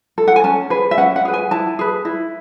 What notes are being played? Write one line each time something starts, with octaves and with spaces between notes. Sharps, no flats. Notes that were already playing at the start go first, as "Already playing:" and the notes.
A4
F#5
G#5
C#4 A5
G#4 B4
E5
C#4 F#5
F#5
G#4 B4
G#5
E4 A5
G#4 B4
E4